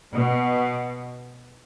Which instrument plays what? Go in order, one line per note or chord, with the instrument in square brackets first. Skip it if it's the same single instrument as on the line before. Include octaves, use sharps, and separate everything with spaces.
[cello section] B2